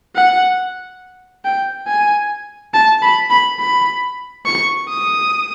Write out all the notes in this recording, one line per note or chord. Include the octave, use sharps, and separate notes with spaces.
F#5
G5
G#5
A5
B5
B5
B5
C#6
D#6